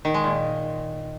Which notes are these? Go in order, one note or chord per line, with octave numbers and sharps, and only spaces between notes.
D#3
G#3
A#2